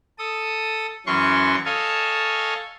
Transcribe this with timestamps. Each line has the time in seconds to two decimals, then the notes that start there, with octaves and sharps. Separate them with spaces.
0.18 A4 D#6
1.07 F#2 E3 C#4 C6 C#6
1.65 A4 C#5 D#5 F5 G#5 A5